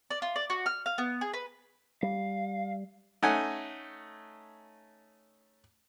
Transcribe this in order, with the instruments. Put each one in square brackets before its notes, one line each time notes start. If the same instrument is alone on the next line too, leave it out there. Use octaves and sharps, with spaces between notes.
[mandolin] D5
F4
D5
F#4
F6
F5
B3
G#4
B4
[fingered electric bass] G3 [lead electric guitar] F5
[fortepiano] A3 C#4 D#4 F#5 G#5